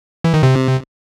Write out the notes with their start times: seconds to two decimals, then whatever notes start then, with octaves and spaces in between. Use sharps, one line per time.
0.24 E3
0.34 D#3
0.43 C3